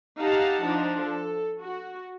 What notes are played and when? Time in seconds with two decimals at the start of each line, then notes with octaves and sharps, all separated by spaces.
0.18 D#4 G4 F5 F#5 A5
0.65 F3 D4 D#4
1.02 A4
1.60 F#4